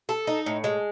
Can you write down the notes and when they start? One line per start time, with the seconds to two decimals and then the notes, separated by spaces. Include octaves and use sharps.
0.09 A4
0.27 D#4
0.46 A2
0.64 G#3